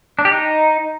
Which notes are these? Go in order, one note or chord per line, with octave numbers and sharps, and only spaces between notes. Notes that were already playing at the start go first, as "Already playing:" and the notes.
D4
G4
D#4